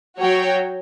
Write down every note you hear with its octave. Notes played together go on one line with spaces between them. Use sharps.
F#3 F#4 C#5 G5